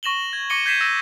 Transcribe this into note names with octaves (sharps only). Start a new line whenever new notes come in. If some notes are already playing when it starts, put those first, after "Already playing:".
C#6 A#6 E7 F#7 G7
G#6
C#6 D6 A#6 C#7 D#7 G7
G6 G#6 B6 C7 D#7 E7
E6 A#6